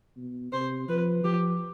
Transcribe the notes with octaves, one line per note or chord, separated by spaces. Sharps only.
B2
C3 C5
F3 B4
F3 G4